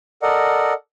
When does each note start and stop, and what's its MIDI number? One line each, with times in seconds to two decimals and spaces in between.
0.22 0.73 69
0.22 0.73 70
0.22 0.73 74
0.22 0.73 75
0.22 0.73 78